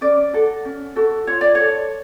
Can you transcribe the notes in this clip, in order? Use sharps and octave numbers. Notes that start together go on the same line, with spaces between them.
C#4 D5
F#4 A4
C#4
F#4 A4
F4 C#5
D5
A4 C#5